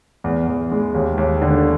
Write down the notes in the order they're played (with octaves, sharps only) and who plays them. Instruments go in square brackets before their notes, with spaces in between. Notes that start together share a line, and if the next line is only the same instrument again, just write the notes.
[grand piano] E2
E2
G#3
D#2
D#2
D3